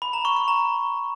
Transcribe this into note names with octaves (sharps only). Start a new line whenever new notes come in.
B5
A#5
C#6
C#6
A#5